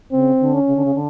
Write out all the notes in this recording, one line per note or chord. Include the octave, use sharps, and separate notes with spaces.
C#3 C4
D3
C#4
C#3
D3
C#3
D3